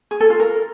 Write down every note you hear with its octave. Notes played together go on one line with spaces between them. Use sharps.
G#4
A4
F4
A#4